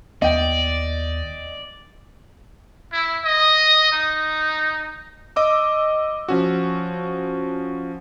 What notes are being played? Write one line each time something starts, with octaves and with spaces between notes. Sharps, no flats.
D#2 B3 D5 D#5 G5
E4
D#5
D#4
D#5 D6 E6
F3 C#4 F#4